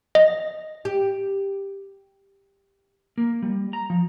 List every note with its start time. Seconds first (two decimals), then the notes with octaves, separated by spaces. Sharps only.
0.15 D#5
0.85 G4
3.18 A#3
3.42 G3
3.73 A#5
3.90 F3